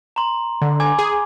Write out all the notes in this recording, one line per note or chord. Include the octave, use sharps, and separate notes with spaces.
A#5 C6
D3
G#5 D6 G#6
G#4